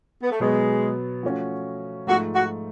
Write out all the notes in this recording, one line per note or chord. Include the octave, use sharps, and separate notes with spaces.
B3
A3
B2 F#3 G#3 B3
F3 A3 C#4 F#4
G#2 F3 A3 F#4
F#4